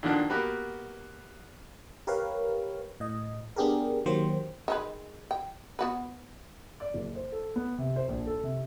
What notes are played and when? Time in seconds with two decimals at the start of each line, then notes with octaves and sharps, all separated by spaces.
0.03 A#2 D3 D#3 F3 D4 F#4
0.30 A#3 B3 F#4 G4 B4
2.07 G4 A#4 B4 C#5 F5
3.00 A2 D#5
3.56 B3 D4 G4 G#4 A#4
4.06 D#3 F#3 A#3 G4 C5
4.68 D#3 G#3 B4
5.31 G5
5.79 B3 F#4 B4
6.80 D5
6.94 F#1
7.15 C5
7.32 A4
7.56 B3
7.78 C3
7.96 C5
8.09 A#1
8.27 A4
8.43 C3